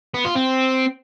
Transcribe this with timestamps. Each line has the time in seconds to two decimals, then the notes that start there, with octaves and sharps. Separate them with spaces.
0.14 B3
0.25 F4
0.35 C4